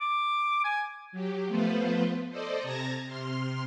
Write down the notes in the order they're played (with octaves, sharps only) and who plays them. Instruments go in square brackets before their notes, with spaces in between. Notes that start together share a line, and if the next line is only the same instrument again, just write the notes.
[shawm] D6
G#5
[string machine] F#3 G4
F3 A3 B3 F4 B4 C5
A4 C5 D5 D#5
C3 A5 A#5 G#6 A#6
C3 C6 F6